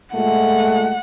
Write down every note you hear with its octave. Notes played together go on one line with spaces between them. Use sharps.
A#2 G#3 A3 F#5